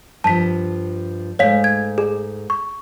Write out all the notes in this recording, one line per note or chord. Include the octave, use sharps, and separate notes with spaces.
G2 F3 A5 B6
G#2 A3 C#5 F5 B6
G#6
G#4
C#6